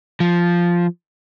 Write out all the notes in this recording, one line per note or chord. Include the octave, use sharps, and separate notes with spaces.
F3